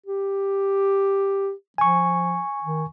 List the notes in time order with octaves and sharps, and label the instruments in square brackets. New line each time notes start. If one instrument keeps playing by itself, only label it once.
[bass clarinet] G4
[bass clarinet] F3 [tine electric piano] G#5 C#6
[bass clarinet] D#3